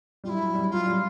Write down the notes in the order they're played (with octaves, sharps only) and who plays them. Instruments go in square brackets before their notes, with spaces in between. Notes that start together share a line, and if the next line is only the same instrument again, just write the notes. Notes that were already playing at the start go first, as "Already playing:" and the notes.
[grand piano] G3 [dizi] F4
[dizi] E4
[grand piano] F#3
G3
[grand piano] F#3 [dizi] F4
[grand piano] G3